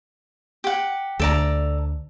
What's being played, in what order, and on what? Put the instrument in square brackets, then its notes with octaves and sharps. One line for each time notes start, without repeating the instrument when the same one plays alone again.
[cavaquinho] G4 F#5
[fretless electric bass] D2 [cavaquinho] A4 D5 A#5